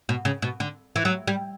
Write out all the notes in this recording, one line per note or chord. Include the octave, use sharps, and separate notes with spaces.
B2
C#3
B2
D3
E3
F#3
G3